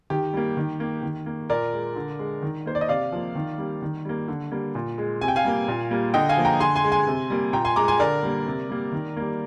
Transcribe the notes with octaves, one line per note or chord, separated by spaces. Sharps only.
D#3 G4
G3 A#3
D#3
A#3
D#3
A#3
A#2 A#4 D5
G#3
D3
G#3
D#3
A#3 C5
D5
D#5
C3 D5 F5
F3 A#3
D#3
G3 A#3
D#3
G3 A#3
D3
G3 A#3
A#2
G#3
C3 G#5
G5
F5 G#5
G3 A#3
A#2
G3 A#3
D3 D#5 G5
F5 G#5
F3 A#3
G5 A#5
D3 G#5 C6
G#5 C6
G#3
G#5 C6
C3
G3 A#3
A#2 G5 A#5
G#5 C6
G#3 A#5 D6
G#5 C6
D3 A#4 D5
G3 A#3
C3
G3 A#3
D#3
G3 A#3